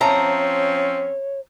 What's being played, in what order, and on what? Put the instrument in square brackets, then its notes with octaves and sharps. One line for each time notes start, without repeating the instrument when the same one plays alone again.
[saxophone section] F3 C4 C#4 [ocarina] C#5 [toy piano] E5 A5 [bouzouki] A#5